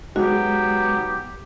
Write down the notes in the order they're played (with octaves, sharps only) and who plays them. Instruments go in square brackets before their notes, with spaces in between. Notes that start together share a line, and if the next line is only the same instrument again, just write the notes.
[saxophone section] F#3 B3 [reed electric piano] G#3 D#4 [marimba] F#4 [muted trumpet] G4